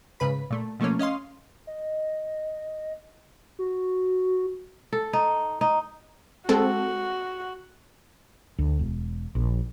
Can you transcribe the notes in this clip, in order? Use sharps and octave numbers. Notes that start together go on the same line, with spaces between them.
G#2 C#3 B4 B5
A#2 A3
B2 F3 A3 A#3 C#4
C#4 D#5 F5 C6
D#5
F#4
A4
D#4
D#4
G#3 C4 F#4 A4
D2
E1
A#1